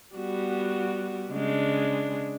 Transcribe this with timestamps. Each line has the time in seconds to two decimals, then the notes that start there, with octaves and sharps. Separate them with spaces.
0.15 G3 B3 F#4
1.31 C#3 G#3 D4